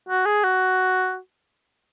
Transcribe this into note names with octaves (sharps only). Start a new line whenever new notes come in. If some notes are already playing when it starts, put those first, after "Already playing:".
F#4
G#4
F#4